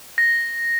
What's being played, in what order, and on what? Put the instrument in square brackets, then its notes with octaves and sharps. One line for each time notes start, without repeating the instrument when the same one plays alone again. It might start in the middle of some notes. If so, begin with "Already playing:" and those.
[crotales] A#6